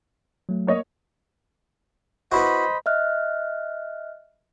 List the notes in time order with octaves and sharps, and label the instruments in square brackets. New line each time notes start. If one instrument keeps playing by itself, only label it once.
[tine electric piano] F#3 A3
[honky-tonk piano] A#3 C#5 D#5
[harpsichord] B3 E4 F#4 [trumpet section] C5 D#5 B5
[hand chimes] D#5 E5 F6 F#6